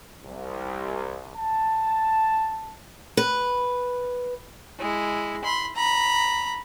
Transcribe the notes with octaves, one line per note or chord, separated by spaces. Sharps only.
C2
A5
B4
G#3 E4
B5 C6
A#5 B5